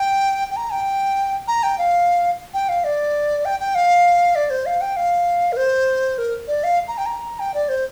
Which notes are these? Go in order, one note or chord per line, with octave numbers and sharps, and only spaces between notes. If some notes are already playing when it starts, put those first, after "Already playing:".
Already playing: G5
G5
A#5
G5
A#5
G5
F5
G5
F5
D5
G5
G5
F5
D5
C5
F5
G5
F5
A#4
C5
A#4
D5
F5
A#5
G5
A#5
G5
D5
C5